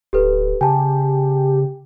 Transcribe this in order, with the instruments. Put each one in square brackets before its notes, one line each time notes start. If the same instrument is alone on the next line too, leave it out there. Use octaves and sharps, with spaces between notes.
[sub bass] D1 [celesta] G4 A4 B4
[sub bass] C#3 [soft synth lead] G4 [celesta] G#5 A5